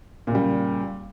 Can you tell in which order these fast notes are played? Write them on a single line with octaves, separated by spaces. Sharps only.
A#2 C#3 G3